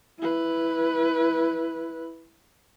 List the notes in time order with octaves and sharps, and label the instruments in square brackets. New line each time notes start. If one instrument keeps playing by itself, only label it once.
[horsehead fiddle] E4 B4